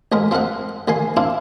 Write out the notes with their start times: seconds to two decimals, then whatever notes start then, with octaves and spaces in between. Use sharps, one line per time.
0.12 A1 G#2 G#3 A#4 A#5
0.31 F3 C4 A#4 D#5 F#5
0.88 A1 D#3 G#5 C6
1.17 C4 D4 E4 F4